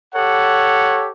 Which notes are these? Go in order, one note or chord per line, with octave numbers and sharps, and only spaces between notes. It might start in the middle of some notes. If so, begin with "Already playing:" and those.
G4 A4 C#5 F#5